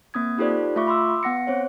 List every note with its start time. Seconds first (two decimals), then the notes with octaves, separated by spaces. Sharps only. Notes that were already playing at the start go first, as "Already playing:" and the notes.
0.14 A#3 C4 D#6 G#6
0.38 D#4 F4 G4 A4 C5 D5
0.76 A3 F4 E5 C#6 D6
0.87 B5 C6 D6 E6
1.23 B3 F#5 A#6 C#7
1.47 C4 C5 C#5